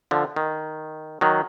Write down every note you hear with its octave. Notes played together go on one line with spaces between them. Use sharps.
D3 F3
D#3
D#3 F#3